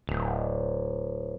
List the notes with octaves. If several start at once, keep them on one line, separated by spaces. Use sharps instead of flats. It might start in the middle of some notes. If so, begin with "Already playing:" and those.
D1